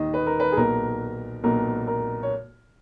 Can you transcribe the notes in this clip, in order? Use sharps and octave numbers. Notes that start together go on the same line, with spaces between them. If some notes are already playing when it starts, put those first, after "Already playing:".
Already playing: D#2 D#3 D#5
B4
A#4
B4
G#4
B1 A#2 A#4
B1 A#2 A#4
A#4
C#5